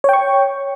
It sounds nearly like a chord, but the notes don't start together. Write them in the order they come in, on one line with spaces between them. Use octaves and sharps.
C#5 G5 C#6